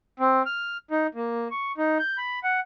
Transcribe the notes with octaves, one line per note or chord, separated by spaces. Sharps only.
C4
F6
D#4
A#3
C#6
D#4
G6
B5
F#5